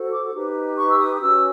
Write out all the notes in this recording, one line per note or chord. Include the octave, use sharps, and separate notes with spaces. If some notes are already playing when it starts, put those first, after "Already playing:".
Already playing: F#4 A4 C5
D6
D#4 G4 B4
C#6
E6
D#6
D#6
C#4 F#4 B4 E6